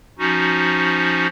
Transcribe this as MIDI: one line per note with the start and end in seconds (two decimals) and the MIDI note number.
0.19 1.27 53
0.19 1.27 61
0.19 1.27 63
0.19 1.27 66